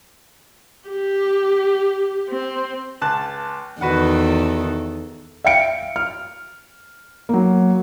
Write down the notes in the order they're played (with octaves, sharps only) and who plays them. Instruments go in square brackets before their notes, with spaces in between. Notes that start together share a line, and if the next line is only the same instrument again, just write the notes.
[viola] G4
C4
[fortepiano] C#2 A5 F#6
[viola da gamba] E2 D#3 A4 [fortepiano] F#4 B4 F#5
[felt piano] E5 F5 G5 C#7 D7
F6
F#3 A#3